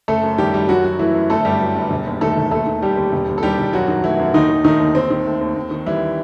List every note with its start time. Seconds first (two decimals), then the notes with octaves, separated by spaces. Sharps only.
0.08 F#1 A3 A4
0.23 F#2
0.38 D#3 G3 G4
0.54 F#3 G3 G4
0.69 F#2 F#3 F#4
0.84 F#3 F#4
0.99 E3 A3 E4
1.14 F#2
1.30 G1 A3 A4
1.45 G2 G3 G4
1.61 F#3
1.76 G1
1.90 E1
2.06 D#2
2.21 D#3 A3 A4
2.36 E1
2.51 D#2 A3 A4
2.66 D#3
2.82 G3 A3 G4
2.97 D#2
3.13 E1
3.28 D#2
3.38 A4
3.43 D#3 G3 G4
3.58 E1
3.73 F#2 F#3 F#4
3.88 D#3
4.04 E3 A3 E4
4.19 F#2
4.34 D#2 D#3 D#4
4.49 D#3
4.64 D#3 A3 D#4
4.80 D#2
4.95 D#2 C4
5.10 D#3
5.26 A3
5.41 D#2
5.56 D#2
5.71 D#3
5.86 E3 G3 E4